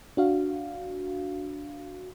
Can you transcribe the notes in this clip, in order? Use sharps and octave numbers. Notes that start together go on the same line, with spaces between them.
D4 F#4 F5